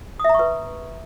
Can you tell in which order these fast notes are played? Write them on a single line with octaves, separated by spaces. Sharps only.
D#6 E5 A#5 C#6 B4